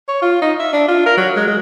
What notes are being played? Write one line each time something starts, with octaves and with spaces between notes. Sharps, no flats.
C#5
F4
D#4
E5
D4
F4
A#4
F#3
G#3
G#3